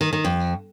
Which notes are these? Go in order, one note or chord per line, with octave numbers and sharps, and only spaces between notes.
D#3
D#3
F2